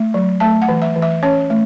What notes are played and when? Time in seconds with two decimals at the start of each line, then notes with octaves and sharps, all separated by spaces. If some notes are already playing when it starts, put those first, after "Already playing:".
Already playing: A3
0.14 F#3
0.40 A3 A5
0.62 F#5
0.68 E3
0.82 E5
0.96 E3
1.02 E5
1.23 C#4 C#5
1.50 A3